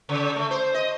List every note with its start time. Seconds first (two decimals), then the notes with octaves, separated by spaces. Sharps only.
0.09 C#3
0.36 A3
0.51 C5
0.74 D#5